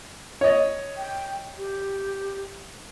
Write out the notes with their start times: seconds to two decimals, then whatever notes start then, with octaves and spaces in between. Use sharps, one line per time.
0.41 C#5 D#5
0.97 G5
1.57 G4